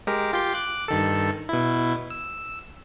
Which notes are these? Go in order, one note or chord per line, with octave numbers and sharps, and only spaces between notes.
G#3 G4 A#4
F4 G4 C6
D6 F#6
G2 D#3 A4
B2 E4
E6